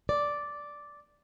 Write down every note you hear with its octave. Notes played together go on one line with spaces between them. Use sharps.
D5